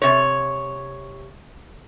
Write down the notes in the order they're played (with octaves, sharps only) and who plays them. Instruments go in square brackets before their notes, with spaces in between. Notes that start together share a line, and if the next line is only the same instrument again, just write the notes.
[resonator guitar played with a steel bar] C3 C#5